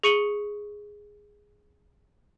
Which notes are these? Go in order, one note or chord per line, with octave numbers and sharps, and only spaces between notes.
G#4 C#6 C#7 D#7 F#7 G7